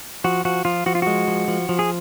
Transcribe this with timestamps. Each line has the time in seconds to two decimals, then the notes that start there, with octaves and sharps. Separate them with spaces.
0.24 F3 F#4
0.45 F3 F#4
0.65 F3 F4
0.86 F3 F#4
0.95 F4
1.02 G#3 F#4
1.28 F3
1.48 F3
1.69 F3
1.79 G#4